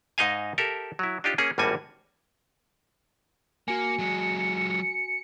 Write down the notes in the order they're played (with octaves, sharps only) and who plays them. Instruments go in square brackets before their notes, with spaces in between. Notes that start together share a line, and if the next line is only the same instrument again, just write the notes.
[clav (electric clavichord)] G#2 D#4 D#5 F5 G#5
G4 A4 A#4 E5
F#3 E4
D4 D#4 F4 G4
A#3 C#4 G#4
G#1 A2 G3 A#3 F#4 G#5
[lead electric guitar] A#3 [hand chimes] F#4 G#5 [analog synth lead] C#7
[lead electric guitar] F#3 G#3